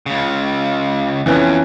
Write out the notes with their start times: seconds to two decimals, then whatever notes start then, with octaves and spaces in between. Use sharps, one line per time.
0.06 C#2 C#3
1.26 F2 E3 B3 C#4